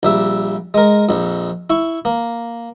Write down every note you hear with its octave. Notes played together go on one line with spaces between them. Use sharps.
A#1 G3 E5
G#3 A#4
A#1 F2
E4 C#6
A#3